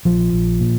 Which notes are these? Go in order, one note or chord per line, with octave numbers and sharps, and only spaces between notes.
A#1 F3
A#1
A#2